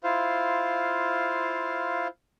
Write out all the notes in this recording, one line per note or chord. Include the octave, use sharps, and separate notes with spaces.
E4 F4 C5 F5